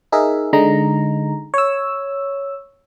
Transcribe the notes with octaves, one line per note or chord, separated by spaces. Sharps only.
D#4 G#4 A#4 E5
D3 G#3 D#4 A#5
C#5 E6